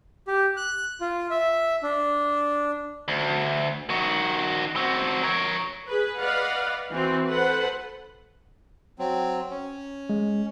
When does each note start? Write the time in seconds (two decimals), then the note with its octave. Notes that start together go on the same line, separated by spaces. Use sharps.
0.28 G4
0.57 F#6
1.01 F4
1.30 E5
1.83 D4
3.08 D2
3.89 D#3 F#4
4.76 C4 F#4
5.23 A#4 C#5
5.88 G#4 B4
6.19 B4 D5 D#5 F5 F#5
6.92 E3 C4 F#4
7.28 A4 B4 C5 F#5
8.99 F#3 C4
9.51 C#4
10.10 G#3